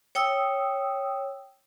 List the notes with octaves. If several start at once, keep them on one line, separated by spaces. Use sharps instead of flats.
C#5 G5 D#6 E6